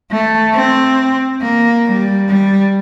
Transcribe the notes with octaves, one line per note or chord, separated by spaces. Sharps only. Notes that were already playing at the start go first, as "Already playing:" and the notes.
A3
C4
A#3
G3
G3